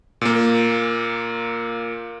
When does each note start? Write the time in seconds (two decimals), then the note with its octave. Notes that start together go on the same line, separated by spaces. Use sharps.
0.21 A#2 A#3